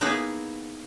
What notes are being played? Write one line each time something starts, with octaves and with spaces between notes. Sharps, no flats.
A#3 B3 D#4 E4 G#4 B4